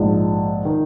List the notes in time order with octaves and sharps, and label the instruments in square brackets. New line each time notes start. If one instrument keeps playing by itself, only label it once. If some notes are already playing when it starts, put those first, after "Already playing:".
Already playing: [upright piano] A#1 G#2 G#3
D#3